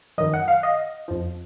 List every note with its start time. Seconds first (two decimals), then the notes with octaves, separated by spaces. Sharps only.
0.18 F#2 D#3 F#3 D#5
0.34 F#5
0.48 F5
0.63 D#5
1.08 F2 F3